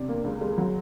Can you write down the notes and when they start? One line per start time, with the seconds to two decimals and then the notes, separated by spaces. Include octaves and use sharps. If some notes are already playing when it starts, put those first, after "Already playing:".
Already playing: C3 D4
0.09 A#3
0.24 C#2
0.41 G#3
0.58 F#3